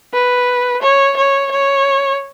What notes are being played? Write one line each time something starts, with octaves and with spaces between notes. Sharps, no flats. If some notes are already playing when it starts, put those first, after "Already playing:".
B4
C#5
C#5
C#5